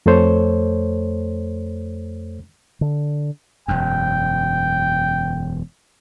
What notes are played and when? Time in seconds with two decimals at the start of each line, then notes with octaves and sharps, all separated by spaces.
0.06 F2 A3 A4 C5 C#5
2.81 D3
3.68 E1 F#2 G5